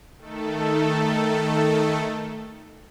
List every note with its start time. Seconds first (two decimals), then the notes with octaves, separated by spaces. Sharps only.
0.18 D#3 A3 A4